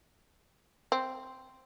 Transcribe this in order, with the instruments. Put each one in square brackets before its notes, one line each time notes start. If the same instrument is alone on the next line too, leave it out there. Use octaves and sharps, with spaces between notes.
[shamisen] C4